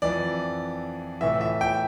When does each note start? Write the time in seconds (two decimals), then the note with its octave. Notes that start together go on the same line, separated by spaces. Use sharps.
0.02 F2 E3 D5
1.21 A2 E3 E5
1.41 E5
1.61 G5